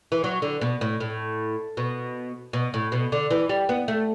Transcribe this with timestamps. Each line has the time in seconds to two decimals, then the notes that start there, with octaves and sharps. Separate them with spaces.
0.12 E3
0.24 F#3
0.42 D3
0.61 B2
0.81 A2
1.00 A2
1.77 B2
2.53 B2
2.74 A2
2.92 B2
3.12 D3
3.31 E3
3.49 G3
3.69 B3
3.88 A3